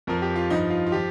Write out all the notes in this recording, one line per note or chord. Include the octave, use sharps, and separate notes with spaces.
F2 F3 A#4
G4
F4
G2 F3 D#4
F4
F4
F3 G4